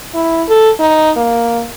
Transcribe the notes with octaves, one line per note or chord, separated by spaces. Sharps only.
E4
A4
D#4
A#3